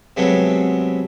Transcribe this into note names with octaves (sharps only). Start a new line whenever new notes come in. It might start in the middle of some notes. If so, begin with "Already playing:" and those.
C3 F#3 G#3 A3 B3 C4